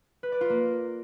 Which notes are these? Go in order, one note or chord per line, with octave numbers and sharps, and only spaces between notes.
B4
D5
F4
A#3